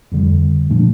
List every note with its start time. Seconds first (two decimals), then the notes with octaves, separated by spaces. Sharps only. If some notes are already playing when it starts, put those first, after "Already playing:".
0.12 F2 D3 G3
0.70 A#2 F3 A3 D4